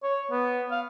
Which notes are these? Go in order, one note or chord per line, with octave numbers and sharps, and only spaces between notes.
C#5
B3
F5